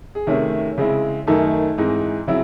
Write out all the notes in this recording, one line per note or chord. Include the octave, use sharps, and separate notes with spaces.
G#4
C3 D#3 A3 C#4
C#3 G#3 C4 E4
F#2 D#3 A3 D#4 A4
G#2 E3 G#3 C4 D#4
C#3 F#3 C4 E4